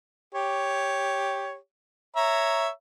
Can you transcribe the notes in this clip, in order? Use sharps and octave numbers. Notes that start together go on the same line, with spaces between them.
G4 C#5
C#5 E5 A#5